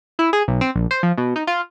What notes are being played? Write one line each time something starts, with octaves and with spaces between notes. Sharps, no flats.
E4
G#4
B1
C4
A#1
C5
F3
B2
D#4
F4